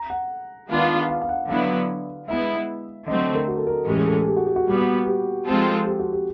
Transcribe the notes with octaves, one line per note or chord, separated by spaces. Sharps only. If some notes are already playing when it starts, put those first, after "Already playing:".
Already playing: A#5
F#5
D#3 G#3 B3 D4 F4
F5
F5
F#5
D3 F#3 B3 E4 F5
G#3 B3 E4 E5
D3 F#3 A3 C4 D#5
A#4
F#4
A4
A#4
A2 E3 G#3 C#4 G4
G#4
A4
G#4
G4
F#4
G4
F#4
A#2 G3 B3
G4
F3 G#3 C4 F4 A4
G4
F#4
G4